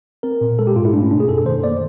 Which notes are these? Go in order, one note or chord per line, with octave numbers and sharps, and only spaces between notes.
C4 A#4
A#2
G#3 A4
G4
G#2 F4
E4
A3 D4
C#4
B2 D4
G#4
F#2 A4
D#3 C5
A#3 D5